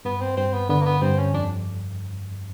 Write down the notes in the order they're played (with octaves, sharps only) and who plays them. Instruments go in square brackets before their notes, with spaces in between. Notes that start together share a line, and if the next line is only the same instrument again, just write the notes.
[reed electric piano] G2 [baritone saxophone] B3
[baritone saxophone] C4
[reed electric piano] G2 [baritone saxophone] C4
[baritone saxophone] B3
[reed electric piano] D3 [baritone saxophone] B3
[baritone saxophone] A#3
B3
[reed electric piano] G2 [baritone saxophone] C4
[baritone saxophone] C#4
[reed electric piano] F2 [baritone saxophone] D4